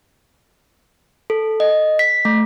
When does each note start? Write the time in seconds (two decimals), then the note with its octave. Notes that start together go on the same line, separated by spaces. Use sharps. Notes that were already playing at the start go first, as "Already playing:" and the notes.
1.30 A4
1.60 D#5
1.99 B6
2.25 A3